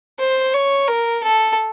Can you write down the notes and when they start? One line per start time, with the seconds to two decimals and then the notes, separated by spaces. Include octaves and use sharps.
0.20 C5
0.54 C#5
0.88 A#4
1.23 A4